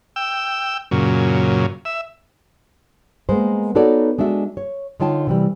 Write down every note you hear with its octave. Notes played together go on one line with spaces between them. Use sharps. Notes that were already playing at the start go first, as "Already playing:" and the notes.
G5 E6
F#2 A#2 C#3
E5
G#3 A#3 B3 C5
B3 D#4 F#4 A4 C#5 D5
G#3 D4 F#4 E5
C#5
D3 D#4 F4 C#5 G5 A5
C3 E3 G3